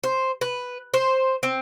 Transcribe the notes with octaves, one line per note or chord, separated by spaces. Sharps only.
C5
B4
C5
C4